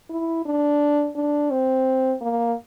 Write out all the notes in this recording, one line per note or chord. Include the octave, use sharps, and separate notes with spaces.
E4
D4
D4
C4
A#3